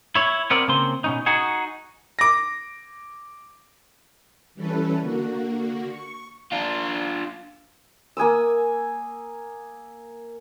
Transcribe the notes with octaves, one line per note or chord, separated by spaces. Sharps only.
E4 C#5
B3 C4 A#4 D5
C#3 A#3 C4 C6
B2 C#4 D#4
D#4 F#4 G#4
D6 A#6
E3 G3 C#4 A4 B4
D3 A#3 F#4
C#6
D4 F4
A#3 G#5 D#6 E6